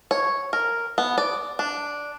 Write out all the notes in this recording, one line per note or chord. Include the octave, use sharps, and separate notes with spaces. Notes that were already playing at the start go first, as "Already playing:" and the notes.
C#5
A#4
B3
D5
D4